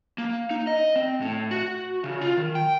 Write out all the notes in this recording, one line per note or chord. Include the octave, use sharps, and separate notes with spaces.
A#3
D#4
D#5
C4
A2
F#4
C#3
F4
D#3
G5